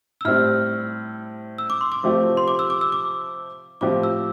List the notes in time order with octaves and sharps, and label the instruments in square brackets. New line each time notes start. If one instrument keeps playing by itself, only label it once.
[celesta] E6
[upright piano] A2 G3 C4 [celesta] F6
[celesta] E6
D6
C6
D6
[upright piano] C3 F3 A3 C4 G4
[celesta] C6
D6
E6
D6
E6
D6
[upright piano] A2 F3 C4 G4 [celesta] D6
[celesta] E6